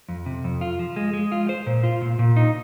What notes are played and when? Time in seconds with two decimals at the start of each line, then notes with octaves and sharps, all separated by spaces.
0.09 F2
0.26 C3
0.44 F2
0.61 F4
0.79 F3
0.96 G#3
1.13 G#3
1.32 F4
1.49 C5
1.66 A#2
1.83 F4
2.02 A#2
2.19 A#2
2.36 D#4